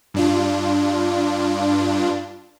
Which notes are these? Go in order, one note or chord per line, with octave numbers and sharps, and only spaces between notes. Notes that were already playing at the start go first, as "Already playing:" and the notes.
G2 D4 F4